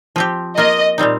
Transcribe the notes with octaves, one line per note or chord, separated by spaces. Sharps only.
F3 C4 G4
A#3 F4 A#4 D#5
A#2 G3 C4 D#4